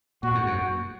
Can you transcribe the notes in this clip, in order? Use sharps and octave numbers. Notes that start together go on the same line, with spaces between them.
A#2 F#4
G#2
F#2